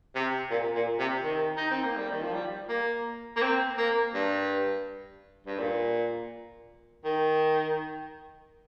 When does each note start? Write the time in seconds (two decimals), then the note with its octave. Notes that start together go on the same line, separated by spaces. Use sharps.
0.15 C3
0.51 A#2
0.75 A#2
0.99 C3
1.23 D#3
1.57 D#4
1.71 C4
1.84 A#3
1.96 G3
2.11 D#3
2.22 F3
2.33 G3
2.69 A#3
3.37 A#3
3.42 C4
3.78 A#3
4.14 G2
5.47 G2
5.60 A#2
7.05 D#3